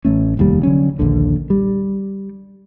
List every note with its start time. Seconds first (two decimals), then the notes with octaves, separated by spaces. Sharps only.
0.05 A1 A3 C#4
0.37 F1 D#2 G3
0.63 D3 F#3 C#4
0.99 A#1 D#2 D3
1.50 G3